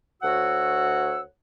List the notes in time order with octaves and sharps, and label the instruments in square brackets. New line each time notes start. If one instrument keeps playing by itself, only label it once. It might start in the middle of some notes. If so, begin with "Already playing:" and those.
[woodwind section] D2 F#4 C#5 F#5 E6